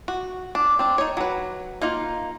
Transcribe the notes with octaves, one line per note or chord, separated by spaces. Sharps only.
F#4
D4
C4 D4
D#4 C#5
F#3 B4
A#3 D#4 F4 F5